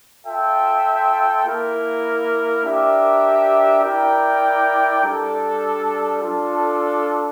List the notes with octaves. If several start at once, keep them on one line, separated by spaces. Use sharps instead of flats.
F4 A4 E5 G5
A#3 E4 A#4
D4 G4 A#4 E5
E4 A#4 D5 G5
G3 D4 A4
D4 F4 A4